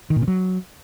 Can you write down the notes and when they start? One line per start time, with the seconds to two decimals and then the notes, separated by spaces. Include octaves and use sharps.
0.10 D#3
0.16 A#2
0.22 C#3
0.28 F#3